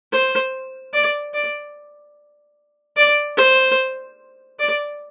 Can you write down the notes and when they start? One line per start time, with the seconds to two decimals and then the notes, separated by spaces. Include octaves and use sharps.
0.13 C5
0.93 D5
1.34 D5
2.97 D5
3.38 C5
4.59 D5